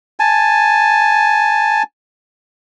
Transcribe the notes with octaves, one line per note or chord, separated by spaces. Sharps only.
G#5 A5